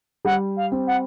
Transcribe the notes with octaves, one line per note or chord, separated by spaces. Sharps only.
G3 F#5
F5
C4
F#5